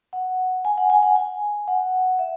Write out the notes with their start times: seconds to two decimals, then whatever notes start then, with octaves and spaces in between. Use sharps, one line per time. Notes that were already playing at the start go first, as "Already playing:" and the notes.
0.13 F#5
0.65 G#5
0.78 F#5
0.90 G#5
1.03 F#5
1.16 G#5
1.68 F#5
2.19 E5